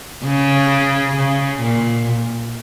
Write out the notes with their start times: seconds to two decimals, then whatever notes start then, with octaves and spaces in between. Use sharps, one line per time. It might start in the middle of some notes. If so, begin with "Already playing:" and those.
0.25 C#3
1.16 C#3
1.61 A#2